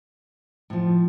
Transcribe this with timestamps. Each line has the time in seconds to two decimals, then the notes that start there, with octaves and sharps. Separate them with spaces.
0.70 A2 F3